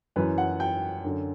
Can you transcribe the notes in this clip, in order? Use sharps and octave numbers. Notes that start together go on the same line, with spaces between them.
F#2 E3 B4
F#5
G5
F#2 D3